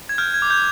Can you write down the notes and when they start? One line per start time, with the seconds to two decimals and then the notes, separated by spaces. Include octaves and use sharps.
0.09 G#6
0.18 F6 G6
0.34 G#6
0.42 D6
0.50 G6